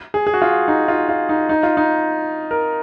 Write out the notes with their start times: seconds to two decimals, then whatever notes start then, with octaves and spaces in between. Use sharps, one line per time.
0.14 G#4
0.27 G#4
0.34 F#4
0.42 F4
0.68 D#4
0.88 F4
1.09 F4
1.29 D#4
1.49 D#4
1.63 F4
1.77 D#4
2.51 A#4